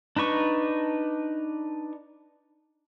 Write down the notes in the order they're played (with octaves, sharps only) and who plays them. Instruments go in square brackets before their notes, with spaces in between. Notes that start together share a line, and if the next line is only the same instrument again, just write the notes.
[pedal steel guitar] D4 D#4 B4 C#6